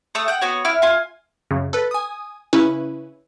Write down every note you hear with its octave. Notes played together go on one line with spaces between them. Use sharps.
A3 D#6 E6
F#5 G5
B3 F#4 C#5
E4 F6
F4 G#5
F#2 C#3
A4 B4
G#5 D#6
C#3 C#4 E4 B4